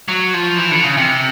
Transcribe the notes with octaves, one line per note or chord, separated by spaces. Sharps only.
F#3
F3
E3
D3
C#3
C3